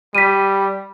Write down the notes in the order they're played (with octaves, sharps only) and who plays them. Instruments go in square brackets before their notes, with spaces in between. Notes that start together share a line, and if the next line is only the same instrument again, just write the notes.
[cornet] G3 [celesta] B6 D#7